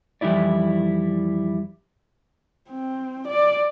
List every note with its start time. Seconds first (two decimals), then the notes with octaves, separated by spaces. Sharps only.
0.21 F2 E3 G3 D#4 E4 D5
2.70 C4
3.28 D5